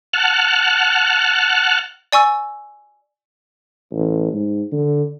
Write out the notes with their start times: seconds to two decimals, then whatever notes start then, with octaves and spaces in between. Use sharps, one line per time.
0.13 F#5 A5 F6 F#6
2.13 D5 G#5 C#6 E6
3.92 A1
4.33 G#2
4.72 D3